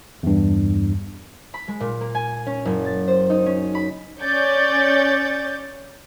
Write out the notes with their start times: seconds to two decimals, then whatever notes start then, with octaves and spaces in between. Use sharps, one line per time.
0.23 E2 G2
1.54 B5
1.68 G#3
1.80 A#2
2.01 A#3
2.15 G#5
2.46 C#4
2.65 F#1
2.85 A6
3.07 C5
3.30 D#4
3.46 C#4
3.75 B5
4.21 C#4 C#5 D5 G6 A6